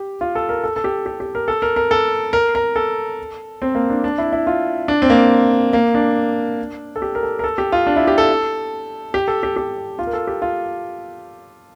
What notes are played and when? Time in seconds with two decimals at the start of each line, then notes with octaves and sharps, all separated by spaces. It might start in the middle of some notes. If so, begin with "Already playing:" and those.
Already playing: G4
0.21 F4
0.35 A4
0.49 A#4
0.64 A4
0.76 A4
0.84 G4
1.06 G4
1.20 G4
1.35 A#4
1.48 A4
1.62 A#4
1.76 A#4
1.91 A4
2.33 A#4
2.55 A#4
2.76 A4
3.62 C4
3.75 A#3
3.90 D4
4.04 D4
4.18 E4
4.33 E4
4.47 F4
4.88 D4
5.02 C4
5.10 A#3
5.73 A#3
5.95 D4
6.96 A4
7.02 G4
7.15 A#4
7.23 A4
7.39 A#4
7.44 A4
7.58 G4
7.72 F4
7.87 D4
7.96 E4
8.07 G4
8.18 A4
9.14 G4
9.28 A4
9.43 G4
9.56 G4
9.99 F4
10.07 A#4
10.13 A4
10.27 G4
10.42 F4